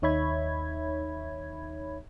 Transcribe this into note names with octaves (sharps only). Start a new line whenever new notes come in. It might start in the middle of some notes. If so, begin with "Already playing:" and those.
D#2 D#4 C#5 E5 B5 G#6